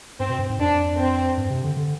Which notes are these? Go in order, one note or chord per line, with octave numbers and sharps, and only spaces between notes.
G2 C4
B2
G2
G#2
F2 D4
C4
G2
C3
D3
D3